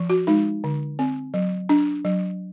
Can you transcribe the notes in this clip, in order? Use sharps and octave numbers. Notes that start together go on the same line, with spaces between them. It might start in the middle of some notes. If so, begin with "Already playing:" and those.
Already playing: F3
F#4
G#3 D#4
D3
C4
F#3
D4
F#3